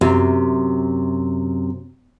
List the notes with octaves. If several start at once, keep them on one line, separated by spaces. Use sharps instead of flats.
F#2 C3